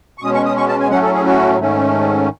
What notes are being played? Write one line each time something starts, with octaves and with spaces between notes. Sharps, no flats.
C#6
B2 G#3 C#4 D#6
C#6
D#6
C#6
A5
G#5
A2 F#3 A3 C#4 F#5
A4
G#4
F#4
G#2 D#3 A3 C#4